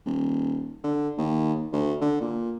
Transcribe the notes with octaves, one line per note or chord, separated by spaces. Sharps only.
D#1
D3
D#2
D2
D3
A#2